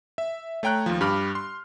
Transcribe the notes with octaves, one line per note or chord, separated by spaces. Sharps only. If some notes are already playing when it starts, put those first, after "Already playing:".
E5
A3 C#5 G5 A#5 F#6
D#2 F3
G2 G4 B5 D6 F6
C6